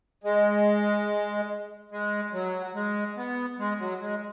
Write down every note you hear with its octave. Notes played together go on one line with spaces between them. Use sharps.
G#3
G#3
F#3
G#3
B3
G#3
F#3
G#3